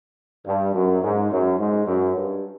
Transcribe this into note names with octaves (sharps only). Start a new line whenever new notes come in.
G2
F#2
G#2
F#2
G#2
F#2
G2